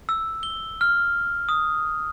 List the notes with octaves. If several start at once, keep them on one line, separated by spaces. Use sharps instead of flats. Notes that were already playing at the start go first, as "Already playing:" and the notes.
E6
G7
F6
D#6